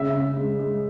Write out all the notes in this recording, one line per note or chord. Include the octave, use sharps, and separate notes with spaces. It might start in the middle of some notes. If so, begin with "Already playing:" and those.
Already playing: C#3 E5
C#3
G#3
G#3